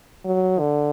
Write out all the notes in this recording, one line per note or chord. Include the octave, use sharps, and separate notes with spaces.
F#3
D3